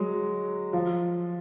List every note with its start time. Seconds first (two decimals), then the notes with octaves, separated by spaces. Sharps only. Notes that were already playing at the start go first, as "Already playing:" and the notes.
Already playing: F#3 G#3
0.73 F3